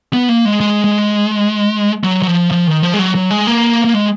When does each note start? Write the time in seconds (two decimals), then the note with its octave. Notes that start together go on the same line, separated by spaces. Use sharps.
0.13 B3
0.29 A#3
0.45 G#3
0.60 G#3
0.84 G#3
2.04 F#3
2.22 F#3
2.27 F3
2.51 F3
2.67 D#3
2.83 F3
2.94 G#3
2.99 F#3
3.15 F#3
3.31 G#3
3.47 A#3
3.84 A#3
3.94 G#3